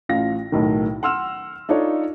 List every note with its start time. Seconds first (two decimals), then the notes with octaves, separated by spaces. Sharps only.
0.09 A1 A2 F4 F5 A#6
0.52 B1 A2 D#3
1.03 F#5 C6 E6 F6 E7
1.69 D4 D#4 F4 A4 C#5